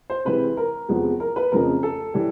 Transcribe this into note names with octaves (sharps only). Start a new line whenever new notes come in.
C5
C3 E3 G#3 B4
A#4
E2 C3 F3 G#3 B3
A#4
B4
F2 C#3 F3 A3 A#4
A4
E3 G3